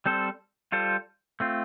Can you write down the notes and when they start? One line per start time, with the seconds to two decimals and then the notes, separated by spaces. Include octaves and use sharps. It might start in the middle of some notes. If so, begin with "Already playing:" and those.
0.06 G3 C4 A4 C5
0.72 G3 F4 A4 C5
1.40 A3 C4 F4